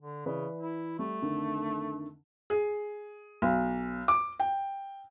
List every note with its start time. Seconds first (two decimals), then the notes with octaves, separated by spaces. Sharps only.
0.01 D3
0.26 C#3 E3 B4 D5
0.59 E4
0.99 G3 A3
1.22 F2 D3 D#3
2.50 G#4
3.42 B1
4.08 D6
4.40 G5